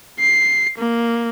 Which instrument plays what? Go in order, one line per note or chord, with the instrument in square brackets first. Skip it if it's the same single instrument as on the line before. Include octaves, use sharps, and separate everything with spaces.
[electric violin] C7
A#3